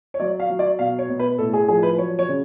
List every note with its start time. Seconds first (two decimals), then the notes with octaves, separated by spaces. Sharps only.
0.14 C#5
0.20 F#3 D5
0.40 F5
0.50 F#3
0.59 D5
0.79 B2 F5
0.99 C#5
1.09 B2
1.19 B4
1.38 A2 A4
1.53 G#4
1.68 F3 G#4
1.83 B4
1.98 F#3 C#5
2.19 C#5
2.29 C#3